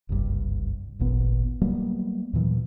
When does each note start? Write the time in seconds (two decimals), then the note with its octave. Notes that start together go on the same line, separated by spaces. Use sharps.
0.09 F#1 C2 G2
0.99 D1 G#1 A#2 B3
1.61 F#3 G3 A#3 B3
2.33 D#2 A#2 E3 F#3